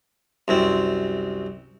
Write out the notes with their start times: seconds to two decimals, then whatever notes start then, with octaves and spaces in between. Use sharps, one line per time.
0.48 C2 F#2 C4